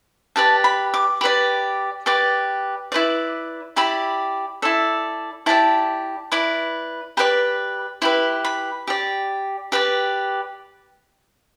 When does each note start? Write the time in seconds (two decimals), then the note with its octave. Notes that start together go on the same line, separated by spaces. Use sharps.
0.36 G4 B4 D5 A5
0.64 B5
0.94 D6
1.21 G4 B4 D5 B5
2.06 G4 B4 D5 D6
2.92 E4 B4 D5
3.76 E4 G4 D5 B5
4.62 E4 A4 D5
5.46 E4 G4 D5 A5
6.32 E4 B4 D5
7.17 G4 B4 D5 B5
8.02 E4 G4 B4 B5
8.45 B5
8.87 G4 D5
9.72 G4 B4 D5